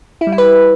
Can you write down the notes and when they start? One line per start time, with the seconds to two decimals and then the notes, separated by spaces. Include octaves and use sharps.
0.21 E4
0.27 G3
0.32 E4
0.38 B4